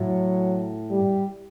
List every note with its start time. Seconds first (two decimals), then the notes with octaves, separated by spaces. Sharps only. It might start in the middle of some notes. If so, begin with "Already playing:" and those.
Already playing: A2 F#3
0.90 G3